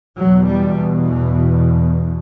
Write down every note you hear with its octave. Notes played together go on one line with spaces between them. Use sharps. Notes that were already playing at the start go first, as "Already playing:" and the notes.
E2 B2 F#3
G3
E3